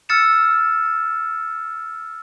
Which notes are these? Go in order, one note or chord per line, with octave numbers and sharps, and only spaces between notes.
E6 F6 A6 C#7 E7